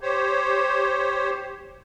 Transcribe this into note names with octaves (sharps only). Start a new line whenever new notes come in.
G4 C5 C#5